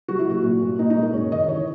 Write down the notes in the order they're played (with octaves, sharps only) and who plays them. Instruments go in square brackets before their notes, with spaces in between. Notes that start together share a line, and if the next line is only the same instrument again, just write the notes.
[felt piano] F#3 F#4
E4
A#2 F#4
A#2
A#2
A#2 D#4
D#4
G#3
A#4
F#2 C#5
D#3 D#5
E3 C#5